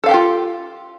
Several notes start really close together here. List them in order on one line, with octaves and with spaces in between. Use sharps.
A4 F5 G4 G5 F4